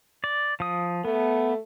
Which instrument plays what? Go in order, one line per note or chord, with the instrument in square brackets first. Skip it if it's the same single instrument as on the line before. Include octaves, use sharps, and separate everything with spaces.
[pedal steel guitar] D5
F3 D#6
[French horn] A3 [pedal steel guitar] B3